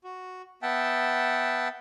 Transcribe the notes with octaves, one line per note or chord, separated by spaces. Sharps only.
F#4
B3 E5 F#5 G5 A5